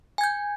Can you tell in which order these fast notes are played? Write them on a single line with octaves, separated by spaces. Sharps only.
G#5 G#6 G6